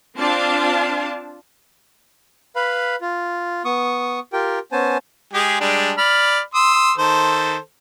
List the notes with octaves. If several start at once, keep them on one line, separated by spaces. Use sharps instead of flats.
C4 D4 F4 D5 F5 A5
B4 F5 B5
F4
B3 C#6 D#6
F4 G4 A#4 G5
B3 C#4 C5 G#5 A5
G#3 G4 G#4
G3 G#3 D4
D5 B5 F6
C6 D#6 E6
D#3 A4 C5